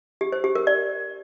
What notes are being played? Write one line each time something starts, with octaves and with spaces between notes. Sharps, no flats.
G4
C5
G4
A#4
D5